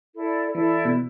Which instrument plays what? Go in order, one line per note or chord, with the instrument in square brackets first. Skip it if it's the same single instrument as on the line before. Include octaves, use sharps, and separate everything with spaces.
[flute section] E4 A4 D5
[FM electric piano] E3 [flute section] E4 A4 D5
[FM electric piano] B2